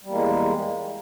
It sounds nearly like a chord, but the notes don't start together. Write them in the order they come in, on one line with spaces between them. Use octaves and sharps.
G3 E2 A#3 G#3